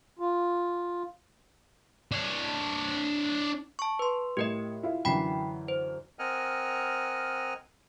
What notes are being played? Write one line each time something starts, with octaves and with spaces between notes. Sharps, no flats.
F4
D4 C#5
A5 C#6
B4 C6
A2 G4 A#4 D#5 C#7
E4 F4
F#2 D3 E3 G5 B5 B6
C5
C4 A#4 D#5 F#5 G#5 F6